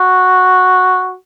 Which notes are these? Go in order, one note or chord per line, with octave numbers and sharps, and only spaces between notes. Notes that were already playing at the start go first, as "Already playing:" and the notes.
Already playing: F#4